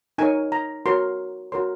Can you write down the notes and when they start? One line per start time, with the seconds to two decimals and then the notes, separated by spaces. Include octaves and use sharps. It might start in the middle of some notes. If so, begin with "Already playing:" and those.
0.18 D#4 A#4 C#5 G#5
0.52 A#5
0.86 F#4 A#4 C#5 C6
1.52 F#4 A#4 C#5 C6